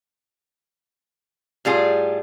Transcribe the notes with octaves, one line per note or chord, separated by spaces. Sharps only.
A2 G3 F4 G#4